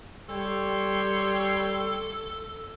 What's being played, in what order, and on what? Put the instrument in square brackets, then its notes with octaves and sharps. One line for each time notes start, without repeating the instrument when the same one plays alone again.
[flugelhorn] G3 [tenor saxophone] A4 [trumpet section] C#5 G5 C6